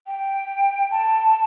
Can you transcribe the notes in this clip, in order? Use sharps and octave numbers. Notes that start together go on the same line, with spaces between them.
G5
A5